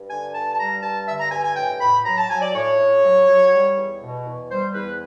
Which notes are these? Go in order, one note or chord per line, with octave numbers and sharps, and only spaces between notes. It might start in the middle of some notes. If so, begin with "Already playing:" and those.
Already playing: G2
D3 G#5
G2 A5
A5
G3 A#5
G2 A5
D3 E5
A#5
G2 G#5
G#5
A2 G5
A2 B5
F#3 A#5
A5
F#3 G#5
D5
A2 C#5
A2
F#3
F#3
G3
E2
B2
E2
G3 C5
E2 B4